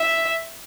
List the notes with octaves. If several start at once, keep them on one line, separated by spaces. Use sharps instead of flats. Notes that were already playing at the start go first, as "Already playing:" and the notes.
Already playing: E5